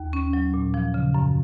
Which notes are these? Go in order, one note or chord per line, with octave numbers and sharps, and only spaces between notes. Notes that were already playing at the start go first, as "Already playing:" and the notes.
Already playing: D#2
C#4
F#3
A#2
F3
C#3
F#2